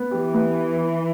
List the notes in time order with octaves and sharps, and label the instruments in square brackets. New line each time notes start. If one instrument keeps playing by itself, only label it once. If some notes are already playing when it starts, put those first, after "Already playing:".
Already playing: [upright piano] B3
[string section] E3 [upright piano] G4
[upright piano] B3